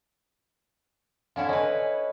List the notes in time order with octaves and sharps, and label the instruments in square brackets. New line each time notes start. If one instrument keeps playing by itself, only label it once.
[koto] D3 C#4 E4 [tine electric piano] F5
[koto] C#4 B4 [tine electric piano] C#5 D#5 G#5